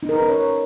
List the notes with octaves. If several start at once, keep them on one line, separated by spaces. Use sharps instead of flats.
D#4
A#4
B4
C#4
C#5